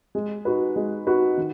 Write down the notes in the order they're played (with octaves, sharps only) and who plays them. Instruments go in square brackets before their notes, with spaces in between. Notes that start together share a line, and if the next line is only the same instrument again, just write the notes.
[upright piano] G#3
D#4 F#4 B4
G#3
D#4 F#4 B4
D#3